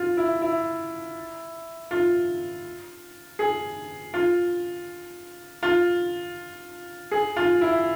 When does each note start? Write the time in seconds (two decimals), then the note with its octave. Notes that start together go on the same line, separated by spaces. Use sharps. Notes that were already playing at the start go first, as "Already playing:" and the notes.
Already playing: F4
0.17 E4
0.42 E4
1.91 F4
3.39 G#4
4.14 F4
5.63 F4
7.11 G#4
7.36 F4
7.61 E4